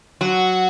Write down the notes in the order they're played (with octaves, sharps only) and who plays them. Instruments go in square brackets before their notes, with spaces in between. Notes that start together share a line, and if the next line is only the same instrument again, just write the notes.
[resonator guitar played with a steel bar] F#3 [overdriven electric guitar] F#4